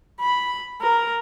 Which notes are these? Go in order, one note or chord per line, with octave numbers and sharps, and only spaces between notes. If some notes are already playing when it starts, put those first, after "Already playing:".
B5
A#4